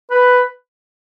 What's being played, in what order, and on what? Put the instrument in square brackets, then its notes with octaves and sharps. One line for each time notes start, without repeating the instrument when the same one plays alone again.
[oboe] B4